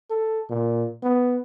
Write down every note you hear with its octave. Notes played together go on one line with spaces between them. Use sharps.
A4
A#2
B3